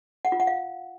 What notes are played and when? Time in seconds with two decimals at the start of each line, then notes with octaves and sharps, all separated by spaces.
0.25 F#5
0.32 F4
0.40 F#5
0.47 F5